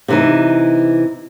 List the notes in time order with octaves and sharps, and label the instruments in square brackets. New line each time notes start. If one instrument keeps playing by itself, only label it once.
[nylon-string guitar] C3 E3 D#4